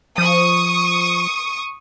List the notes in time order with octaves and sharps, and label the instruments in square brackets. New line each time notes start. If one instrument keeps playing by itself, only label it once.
[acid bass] F3 [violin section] C#6 D#6